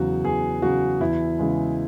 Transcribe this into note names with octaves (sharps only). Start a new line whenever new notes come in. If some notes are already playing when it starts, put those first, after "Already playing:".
Already playing: E2 C#3 F#3 F#4
E2 G#4
C#3 F#3 F#4
E2 E4
C#3 E3 G#3